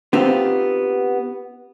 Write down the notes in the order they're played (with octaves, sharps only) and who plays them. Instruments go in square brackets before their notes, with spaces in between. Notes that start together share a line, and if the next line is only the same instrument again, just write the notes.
[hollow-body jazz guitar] B3 C4 D#4 F4 G4